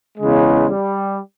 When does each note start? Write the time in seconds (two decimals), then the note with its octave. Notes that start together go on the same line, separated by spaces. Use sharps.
0.18 E2 C#3 G#3
0.69 G3